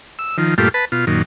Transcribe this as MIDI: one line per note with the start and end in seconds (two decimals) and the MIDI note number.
0.19 0.37 88
0.38 0.54 51
0.38 0.54 53
0.58 0.69 43
0.58 0.69 46
0.58 0.69 57
0.58 0.69 65
0.58 0.69 67
0.74 0.85 71
0.74 0.85 81
0.92 1.05 47
0.92 1.05 65
1.07 1.22 42
1.07 1.22 46
1.07 1.22 51